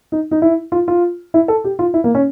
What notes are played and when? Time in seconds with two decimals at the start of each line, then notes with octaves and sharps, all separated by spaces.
0.12 D#4
0.31 D#4
0.42 E4
0.72 F4
0.88 F4
1.34 E4
1.48 A4
1.64 G4
1.79 F4
1.94 E4
2.04 A#3
2.15 C#4